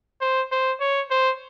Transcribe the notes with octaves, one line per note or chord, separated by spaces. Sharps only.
C5
C5
C#5
C5